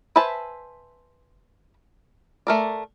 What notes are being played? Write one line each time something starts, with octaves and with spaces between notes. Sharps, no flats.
B4 C5 E5 G#5 A5
A3 A#4 D5